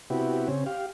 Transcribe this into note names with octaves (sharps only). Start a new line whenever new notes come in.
C3 B3 E4 F#4 G4
C#3 C4 C#4
G4 F5